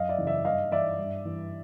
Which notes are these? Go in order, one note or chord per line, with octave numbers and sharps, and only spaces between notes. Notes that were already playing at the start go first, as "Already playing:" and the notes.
Already playing: F#2 D#5 F5
D5 E5
C#3 E3
D5 E5
G2 D#5 F5
E3 D5 E5
G2
E3